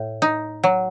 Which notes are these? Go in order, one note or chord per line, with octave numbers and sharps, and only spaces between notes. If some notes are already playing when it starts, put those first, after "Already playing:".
Already playing: A2
D#4
F#3